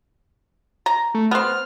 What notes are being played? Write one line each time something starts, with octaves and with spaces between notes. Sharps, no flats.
A#5
A3
B3 C4 F6